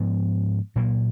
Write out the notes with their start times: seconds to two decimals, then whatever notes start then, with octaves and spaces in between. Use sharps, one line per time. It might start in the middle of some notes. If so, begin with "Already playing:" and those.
Already playing: G#2 F3 B3 D4
0.76 A#2 F#3 A#3